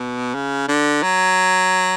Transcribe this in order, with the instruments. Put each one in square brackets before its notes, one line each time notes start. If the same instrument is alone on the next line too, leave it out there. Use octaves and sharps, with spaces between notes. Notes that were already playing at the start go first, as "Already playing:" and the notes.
Already playing: [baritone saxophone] B2
C#3
D3
F#3